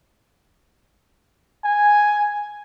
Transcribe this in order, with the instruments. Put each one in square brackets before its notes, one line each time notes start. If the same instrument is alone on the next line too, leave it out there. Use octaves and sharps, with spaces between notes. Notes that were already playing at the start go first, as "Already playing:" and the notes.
[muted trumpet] G#5